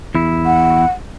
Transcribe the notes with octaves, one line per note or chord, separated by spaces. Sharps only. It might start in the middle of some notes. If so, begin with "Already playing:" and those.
E2 E4
F#5